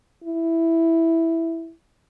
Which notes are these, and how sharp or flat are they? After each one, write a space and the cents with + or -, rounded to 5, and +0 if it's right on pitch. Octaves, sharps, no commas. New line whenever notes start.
E4 +0